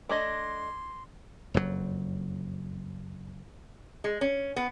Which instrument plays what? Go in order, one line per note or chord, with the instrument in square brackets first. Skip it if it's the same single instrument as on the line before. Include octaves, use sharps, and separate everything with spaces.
[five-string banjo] A3 D4 D#5 [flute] C6 [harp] D6 G#6 A#6
[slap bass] F#1 F2 A2 F#3
[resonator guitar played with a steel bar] G#3
C#4
B3